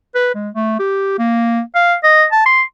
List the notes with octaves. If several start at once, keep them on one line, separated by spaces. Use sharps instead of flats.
B4
G#3
A3
G4
A#3
F5
D#5
A5
C6